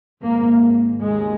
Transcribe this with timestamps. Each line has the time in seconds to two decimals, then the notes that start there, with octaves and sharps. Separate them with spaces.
0.23 G#1 G#2 A#3
1.01 D#2 C#3 G#3